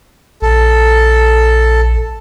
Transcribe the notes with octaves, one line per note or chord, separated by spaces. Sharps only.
A#1 A4